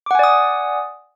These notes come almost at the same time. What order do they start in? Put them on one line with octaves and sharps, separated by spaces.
D6 F#5 G#5 D5 D#6